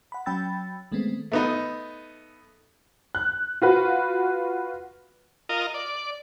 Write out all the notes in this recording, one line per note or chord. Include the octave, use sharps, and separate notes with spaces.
F#5 B5
F#3 C#4 G5 B5 E6 A6
D#3 G#3 A3 B3 C4
A3 B3 D#4
F#6
F4 F#4 B4
F4 A#4 D#5
D5